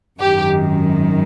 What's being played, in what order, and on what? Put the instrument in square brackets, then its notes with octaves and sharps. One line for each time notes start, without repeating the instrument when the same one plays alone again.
[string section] G#1 F#2 D#3 G4